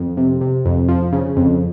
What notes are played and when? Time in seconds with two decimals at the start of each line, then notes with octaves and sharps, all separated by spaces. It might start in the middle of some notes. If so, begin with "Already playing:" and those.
Already playing: F2
0.17 C3
0.41 C3
0.65 F2
0.88 F3
1.12 C#3
1.37 F2